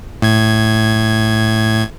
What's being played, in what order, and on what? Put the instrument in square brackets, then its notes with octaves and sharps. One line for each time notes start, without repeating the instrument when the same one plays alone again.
[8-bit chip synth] A2 G#6